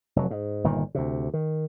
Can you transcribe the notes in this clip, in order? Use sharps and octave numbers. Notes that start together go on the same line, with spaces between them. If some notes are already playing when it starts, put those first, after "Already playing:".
F1 F#3
G#2
G1 A#2 D#3
D2 C3
D#3